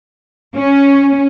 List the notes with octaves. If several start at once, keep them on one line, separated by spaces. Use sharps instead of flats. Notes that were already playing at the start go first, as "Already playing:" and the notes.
C#4